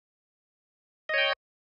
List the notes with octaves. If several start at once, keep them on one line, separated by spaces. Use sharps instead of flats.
C#5 D#5 G5